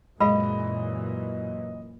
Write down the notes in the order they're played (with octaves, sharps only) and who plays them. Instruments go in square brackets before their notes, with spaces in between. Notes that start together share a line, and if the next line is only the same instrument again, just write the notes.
[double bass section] F#2 A#2 E3 [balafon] G#3 [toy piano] G#4 F5 B5 [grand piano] D#5